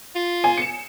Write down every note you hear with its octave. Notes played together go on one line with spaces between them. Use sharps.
F4
G#5
C#7 E7